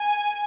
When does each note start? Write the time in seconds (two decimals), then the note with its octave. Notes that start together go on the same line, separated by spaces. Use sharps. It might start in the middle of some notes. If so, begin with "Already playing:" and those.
Already playing: G#5